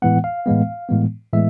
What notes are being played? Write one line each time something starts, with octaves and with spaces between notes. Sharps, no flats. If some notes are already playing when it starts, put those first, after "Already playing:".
A2 E3 G#3 B3 F#5
F5
A2 E3 G#3 B3
A2 E3 G#3 B3
A2 E3 G#3 B3 E5